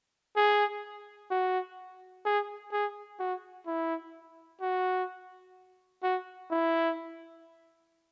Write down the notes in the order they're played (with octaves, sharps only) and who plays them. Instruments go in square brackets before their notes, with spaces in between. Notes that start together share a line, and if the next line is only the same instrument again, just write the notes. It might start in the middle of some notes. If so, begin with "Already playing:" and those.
[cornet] G#4
F#4
G#4
G#4
F#4
E4
F#4
F#4
E4